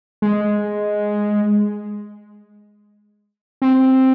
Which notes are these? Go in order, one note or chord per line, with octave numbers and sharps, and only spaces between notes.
G#3
C4